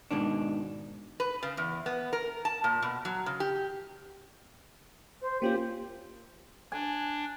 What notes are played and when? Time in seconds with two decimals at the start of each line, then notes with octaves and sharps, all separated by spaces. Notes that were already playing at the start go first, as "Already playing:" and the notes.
0.11 G#2 B2 D#3 D4
1.20 B4
1.43 C#3
1.57 E2
1.86 B3
2.13 A#4
2.45 A5
2.64 A#2
2.82 B2
3.05 F#3
3.26 C#3
3.40 G4
5.22 C5
5.42 A#3 C#4 F4 G4
6.72 D4 G#5